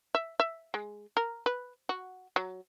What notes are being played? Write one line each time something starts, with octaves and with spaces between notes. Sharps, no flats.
E5
E5
G#3
A#4
B4
F#4
F#3